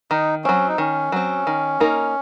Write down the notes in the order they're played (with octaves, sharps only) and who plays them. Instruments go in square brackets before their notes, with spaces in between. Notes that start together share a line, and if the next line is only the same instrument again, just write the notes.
[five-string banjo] D#3 [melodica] D#4
[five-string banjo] F#3 C4 [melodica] C#4
[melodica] D#4
[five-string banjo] D#3 [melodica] C#4
[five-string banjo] F#3 C4
D#3
A#3 D#4 A#4